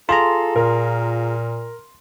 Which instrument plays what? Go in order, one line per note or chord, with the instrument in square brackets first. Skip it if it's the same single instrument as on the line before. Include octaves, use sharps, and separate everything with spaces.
[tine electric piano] F4 G#4 A#5 [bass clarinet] A4 [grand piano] C6
[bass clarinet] A#2 [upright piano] A#4